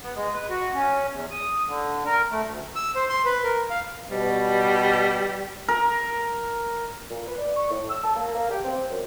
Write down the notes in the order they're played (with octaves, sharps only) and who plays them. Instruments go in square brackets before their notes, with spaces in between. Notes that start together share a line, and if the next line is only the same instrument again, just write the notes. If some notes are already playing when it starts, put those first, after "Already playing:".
[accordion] B3
G#3
B4
F#4
C#4
E2
D#6
D3
A#4
A3
D2
[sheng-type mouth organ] E6
C5
C6
B4
A#4
F5
[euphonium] B2 [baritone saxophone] G3
[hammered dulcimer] A#4
[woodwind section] A#2
B4
D5
C#6
A2
E6
A5
A#3
A#3
G4
C4
F#2